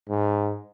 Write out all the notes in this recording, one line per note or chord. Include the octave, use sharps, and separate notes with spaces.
G#2